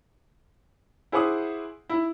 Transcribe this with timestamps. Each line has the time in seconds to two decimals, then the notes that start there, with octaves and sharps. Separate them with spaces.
1.12 E4 G#4 C5 F#5 D6 D#6
1.90 E4